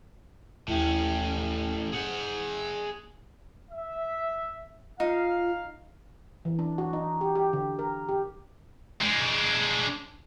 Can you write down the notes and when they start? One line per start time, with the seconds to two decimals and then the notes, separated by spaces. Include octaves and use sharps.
0.68 D#2 A2 C#4 E4 G5
1.93 G#4 F#5 C#7
3.71 E5
5.00 D#4 F4 F5
6.45 E3
6.59 D4
6.78 F#4
6.93 D#4
7.21 G4
7.35 G4
7.53 D3
7.79 A#4
8.09 G4
9.01 G#3 D4